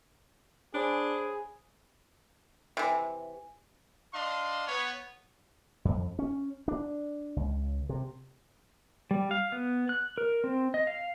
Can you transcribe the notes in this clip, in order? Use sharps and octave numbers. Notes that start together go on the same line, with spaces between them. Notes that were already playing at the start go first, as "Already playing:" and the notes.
D4 G#4 C5 C#5 B5
C3 E3
D4 D#5 F5 C6
B3 C#5
F2
C#4
D4
C#2
C3
G3
F5
B3
F#6
A#4
C4
D#5
F5